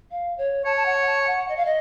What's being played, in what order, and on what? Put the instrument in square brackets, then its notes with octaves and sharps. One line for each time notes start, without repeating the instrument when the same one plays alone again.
[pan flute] F5
C#5
[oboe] C#5 [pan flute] A5
[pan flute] A5
F#5
A5
A5
F#5
D#5
F5
D#5